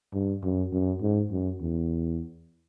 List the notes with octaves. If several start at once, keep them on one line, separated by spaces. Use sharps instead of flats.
G2
F#2
F#2
G#2
F#2
E2